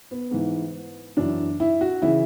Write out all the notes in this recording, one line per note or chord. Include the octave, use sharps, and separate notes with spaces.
B3
G#2 E3
F#2 E3 D4
E4
F#4
C#3 E3 E4